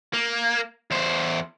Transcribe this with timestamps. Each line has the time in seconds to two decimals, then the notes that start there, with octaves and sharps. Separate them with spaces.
0.13 A#3
0.91 E2 C5